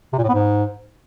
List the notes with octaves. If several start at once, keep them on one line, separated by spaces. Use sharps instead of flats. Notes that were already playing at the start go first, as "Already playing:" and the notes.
C3
A#2
A2
B3
G#2